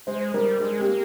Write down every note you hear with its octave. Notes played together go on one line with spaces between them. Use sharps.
G#3 C5
G3 A#4
G#3 G#4
C4 G4
A#3